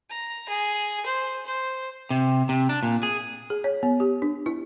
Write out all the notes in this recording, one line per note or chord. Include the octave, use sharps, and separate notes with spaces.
A#5
G#4
C5
C5
C3
C3
D4
A#2
G#4
G#4
C#5
B3
G4
D4
E4